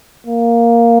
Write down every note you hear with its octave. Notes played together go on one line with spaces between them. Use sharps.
A#3